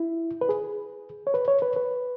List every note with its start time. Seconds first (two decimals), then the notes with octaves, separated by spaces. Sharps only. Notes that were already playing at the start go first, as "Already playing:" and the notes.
Already playing: E4
0.41 B4
0.49 G#4
1.27 C#5
1.34 B4
1.48 C#5
1.62 B4
1.76 B4